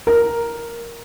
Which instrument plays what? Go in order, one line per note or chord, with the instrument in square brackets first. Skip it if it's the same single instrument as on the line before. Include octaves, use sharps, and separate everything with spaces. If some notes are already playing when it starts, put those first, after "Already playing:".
[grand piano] A#4